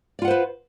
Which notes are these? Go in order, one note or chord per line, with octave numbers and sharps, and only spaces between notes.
F4 B4 C5 D5 F#5